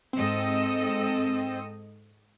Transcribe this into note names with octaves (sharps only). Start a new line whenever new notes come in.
G#2 C4 A4 D#5